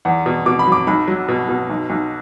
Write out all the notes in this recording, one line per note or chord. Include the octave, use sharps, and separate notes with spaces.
E2 F#5
B2
B2 D6
B5
F#3
D6
B1 B5
F#3
B2
B2
B1
B1